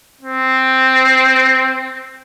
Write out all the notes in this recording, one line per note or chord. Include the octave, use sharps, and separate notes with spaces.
C4